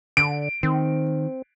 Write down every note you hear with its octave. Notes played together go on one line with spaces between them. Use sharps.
D3 D7
D#3 C4